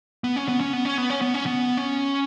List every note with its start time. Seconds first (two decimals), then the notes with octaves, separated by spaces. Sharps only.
0.24 B3
0.36 C#4
0.49 B3
0.61 C#4
0.73 B3
0.85 C#4
0.98 B3
1.10 C#4
1.22 B3
1.34 C#4
1.46 B3
1.77 C#4